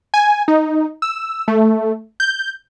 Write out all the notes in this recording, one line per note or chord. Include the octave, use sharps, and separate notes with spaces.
G#5
D#4
E6
A3
G6